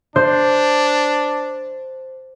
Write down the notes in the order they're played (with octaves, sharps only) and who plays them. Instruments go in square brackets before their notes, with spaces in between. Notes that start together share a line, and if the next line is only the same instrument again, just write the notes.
[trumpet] D4 [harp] C5